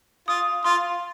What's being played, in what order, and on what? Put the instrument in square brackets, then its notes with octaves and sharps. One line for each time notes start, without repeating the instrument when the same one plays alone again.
[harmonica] F4 [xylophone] D#6
[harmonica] F4 [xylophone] C6